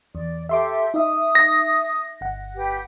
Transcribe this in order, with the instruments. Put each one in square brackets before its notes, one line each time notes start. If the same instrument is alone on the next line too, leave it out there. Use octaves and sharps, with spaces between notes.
[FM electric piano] E2 [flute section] D5
[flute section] G4 A4 [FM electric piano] E5 C6 D6
[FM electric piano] D#4 E5 [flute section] D#6
[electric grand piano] A#6
[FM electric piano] G1 F#5
[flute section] G4 B4 G5